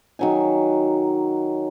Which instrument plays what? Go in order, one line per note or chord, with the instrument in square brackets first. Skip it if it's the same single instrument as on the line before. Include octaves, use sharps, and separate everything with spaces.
[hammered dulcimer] D#3 F#3 G#5